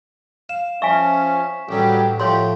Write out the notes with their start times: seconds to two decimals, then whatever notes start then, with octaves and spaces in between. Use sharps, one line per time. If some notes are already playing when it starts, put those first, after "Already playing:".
0.49 F5 E7
0.82 F3 C#4 E5 G#5 C#6 B6
1.69 A1 D3 F#3 G3 G4
2.20 A2 F3 F#3 G4 C#5 C6